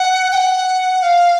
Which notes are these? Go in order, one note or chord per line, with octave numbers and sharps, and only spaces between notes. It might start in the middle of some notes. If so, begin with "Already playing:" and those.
Already playing: F#5
G5
F#5
F5